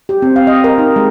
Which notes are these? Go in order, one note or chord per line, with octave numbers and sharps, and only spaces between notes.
G4
C4
F5
D#5
A#4
D#4
G#3